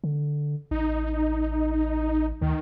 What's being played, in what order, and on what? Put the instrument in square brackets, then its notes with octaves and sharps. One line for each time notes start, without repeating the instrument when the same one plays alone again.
[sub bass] D3
[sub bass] A1 [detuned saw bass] D#4
[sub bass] D2 [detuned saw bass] D#3